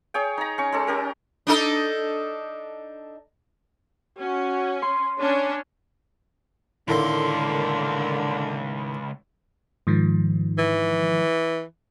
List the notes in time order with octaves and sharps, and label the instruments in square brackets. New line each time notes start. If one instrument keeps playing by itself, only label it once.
[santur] G#4 C#5 G5
D#4 A#5
C#4 C#6
G#3 C#4 A4
C#4 G4 A#4
[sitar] D4 D#4 A4
[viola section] C#4 [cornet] F#4
[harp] C6
[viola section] C#4 D4 [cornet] C#5
[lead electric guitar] C#2 C6 [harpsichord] A2 D#3 [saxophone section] D3 A#3
[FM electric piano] G#2 D#3 F3
[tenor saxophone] E3